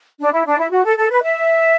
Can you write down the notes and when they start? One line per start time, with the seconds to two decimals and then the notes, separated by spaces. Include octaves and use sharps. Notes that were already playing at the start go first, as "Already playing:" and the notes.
0.20 D4
0.32 E4
0.46 D4
0.59 E4
0.71 F#4
0.85 A4
0.97 A4
1.10 B4
1.22 E5